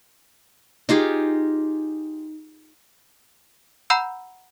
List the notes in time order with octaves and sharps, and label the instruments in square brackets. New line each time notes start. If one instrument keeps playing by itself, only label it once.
[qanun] D#4 F4 G4 G#4
[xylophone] F#5 A#5 B5 E6 G6